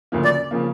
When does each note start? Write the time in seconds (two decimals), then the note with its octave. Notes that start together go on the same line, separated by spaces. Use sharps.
0.12 D2 C#3 F3 A#3
0.25 D5
0.51 C#3 F3 A#3